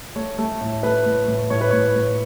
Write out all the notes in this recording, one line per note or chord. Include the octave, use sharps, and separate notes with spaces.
A3 C#5
A3
A2
A3 B4
A2
A2
A2 C#5
B4
A2 C#5
A2